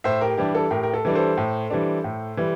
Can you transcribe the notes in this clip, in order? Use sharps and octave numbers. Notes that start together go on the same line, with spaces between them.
A2 C5 E5
G4 A#4
E3 G3 D4 G4
A4
A2 G4 A#4
A#4
A4
E3 G3 D4
A4 C5
A2
E3 G3 D4
A2
E3 G3